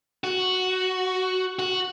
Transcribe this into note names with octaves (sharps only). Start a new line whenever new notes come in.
F#4
F#4